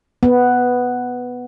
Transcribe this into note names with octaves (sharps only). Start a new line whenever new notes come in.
B3